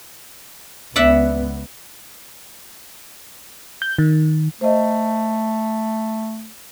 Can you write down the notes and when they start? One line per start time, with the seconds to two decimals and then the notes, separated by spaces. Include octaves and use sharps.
0.96 C#2 B3 D5 E5 F#5
3.82 G6
3.98 D#3
4.61 A3 C5 D#5